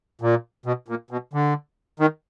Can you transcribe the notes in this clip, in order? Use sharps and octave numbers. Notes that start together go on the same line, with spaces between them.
A#2
B2
A#2
B2
D3
D#3